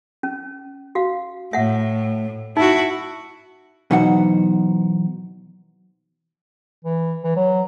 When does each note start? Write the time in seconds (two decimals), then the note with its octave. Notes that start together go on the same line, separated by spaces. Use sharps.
0.23 C#4
0.95 F#4 F5
1.53 A2 E5 F#5
2.57 D#4 E4 F#4
3.91 B2 E3 F#3 D#4 C5 F#5
6.85 E3
7.24 E3
7.36 F#3